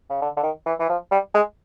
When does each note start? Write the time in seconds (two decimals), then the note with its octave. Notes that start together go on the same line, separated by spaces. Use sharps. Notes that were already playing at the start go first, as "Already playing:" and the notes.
0.09 C#3
0.21 D3
0.36 D3
0.43 D#3
0.66 E3
0.79 E3
0.89 F3
1.11 G3
1.34 G#3